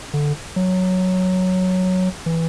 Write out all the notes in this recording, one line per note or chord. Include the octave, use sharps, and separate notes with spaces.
D3
F#3
E3